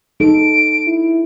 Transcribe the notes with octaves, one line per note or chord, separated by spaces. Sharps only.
D#4 A4 D7
E4